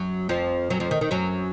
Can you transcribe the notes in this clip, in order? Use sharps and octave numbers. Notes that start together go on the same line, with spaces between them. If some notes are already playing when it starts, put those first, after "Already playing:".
Already playing: F#2 F#3
F2 F3
F#2 F#3
F2 F3
D#3
D#3
F#2 F#3